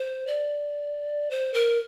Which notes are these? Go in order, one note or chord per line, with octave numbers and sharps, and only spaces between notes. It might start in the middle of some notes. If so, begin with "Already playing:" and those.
Already playing: C5
D5
C5
A#4